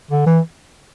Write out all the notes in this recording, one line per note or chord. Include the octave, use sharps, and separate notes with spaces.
D3
E3